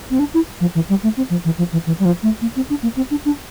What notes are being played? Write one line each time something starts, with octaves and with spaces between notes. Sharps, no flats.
C4
D4
E4
F3
E3
G3
A3
C4
F3
E3
F3
E3
E3
G3
F3
A3
A#3
C4
D4
A#3
C4
D4
D4